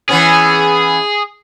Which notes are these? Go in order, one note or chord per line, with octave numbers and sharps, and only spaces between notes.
E3 B3 C#4 G#4